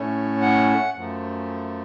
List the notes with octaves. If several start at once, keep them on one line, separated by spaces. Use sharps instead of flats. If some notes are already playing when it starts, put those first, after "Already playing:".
Already playing: A2 A3 C#4
F#5
F#2 F3 A3